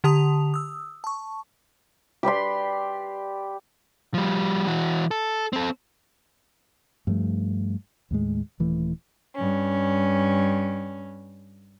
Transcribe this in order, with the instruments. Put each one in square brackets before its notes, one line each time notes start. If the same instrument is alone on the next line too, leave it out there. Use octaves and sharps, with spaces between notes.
[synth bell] D3 G4 A5 D#6 F7
D#6 E6
A5 C#6
[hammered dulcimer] G4 B4 D5 C6
[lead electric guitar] F3 G3
E3 F#4
A4
C4 A4
[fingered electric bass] G2 F3 A3
D#2 A2 G#3
D#1 E3 A3
[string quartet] G2 C#4